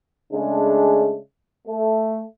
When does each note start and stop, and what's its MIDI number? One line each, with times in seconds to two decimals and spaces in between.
0.33 1.16 49
0.33 1.16 56
0.33 1.16 57
0.33 1.16 62
1.68 2.22 57